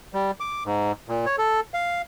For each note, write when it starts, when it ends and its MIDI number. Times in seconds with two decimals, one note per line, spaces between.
0.14 0.31 55
0.40 0.63 86
0.66 0.92 44
1.09 1.26 46
1.26 1.36 73
1.38 1.60 69
1.74 2.02 77